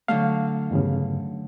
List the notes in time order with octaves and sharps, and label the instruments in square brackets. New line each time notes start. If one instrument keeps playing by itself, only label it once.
[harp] D3 F#3 A3 [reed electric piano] F5
[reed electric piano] E2 G2 C#3